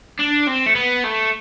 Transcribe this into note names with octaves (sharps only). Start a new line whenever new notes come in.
D4
C4
A3
B3
A3